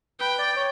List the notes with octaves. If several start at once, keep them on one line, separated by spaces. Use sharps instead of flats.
B4 G5
D5
C#5